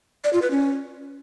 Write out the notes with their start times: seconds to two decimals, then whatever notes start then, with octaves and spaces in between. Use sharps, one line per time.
0.24 D5
0.33 F4
0.42 B4
0.51 C#4